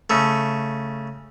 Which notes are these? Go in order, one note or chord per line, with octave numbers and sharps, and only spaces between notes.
C#3 A3